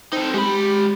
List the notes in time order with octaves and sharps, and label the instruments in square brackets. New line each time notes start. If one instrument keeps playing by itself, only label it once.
[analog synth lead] C4 [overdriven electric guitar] D#4 A4
[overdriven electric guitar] G#3 B5 [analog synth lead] G4